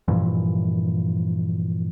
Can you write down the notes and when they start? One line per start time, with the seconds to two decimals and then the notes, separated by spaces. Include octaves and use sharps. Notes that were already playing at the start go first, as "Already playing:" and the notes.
0.08 G2 A#2 E3 F3